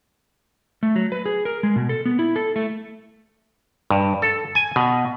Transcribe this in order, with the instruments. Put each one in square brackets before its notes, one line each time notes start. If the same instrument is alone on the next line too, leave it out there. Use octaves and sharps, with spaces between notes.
[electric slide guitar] A3
F#3
B4
G#4
A#4
G#3
B2
A4
B3
E4
A4
A3
[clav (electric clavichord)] G2
A4
G#5
B2